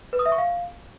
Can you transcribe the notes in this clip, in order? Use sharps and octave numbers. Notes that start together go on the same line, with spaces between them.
B4
D#6
E5
C#6
F5